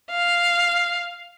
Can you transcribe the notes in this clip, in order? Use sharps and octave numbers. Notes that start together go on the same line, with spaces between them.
F5